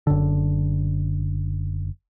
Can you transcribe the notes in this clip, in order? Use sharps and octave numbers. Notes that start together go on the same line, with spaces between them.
F#1 D3